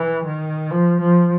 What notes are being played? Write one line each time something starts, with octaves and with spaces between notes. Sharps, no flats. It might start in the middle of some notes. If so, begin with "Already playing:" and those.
Already playing: E3
D#3
F3
F3